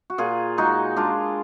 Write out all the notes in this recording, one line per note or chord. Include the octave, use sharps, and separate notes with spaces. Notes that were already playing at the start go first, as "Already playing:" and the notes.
F#4
A#2 F4 G#4
G#3 D#4 F#4
G#3 D4 F4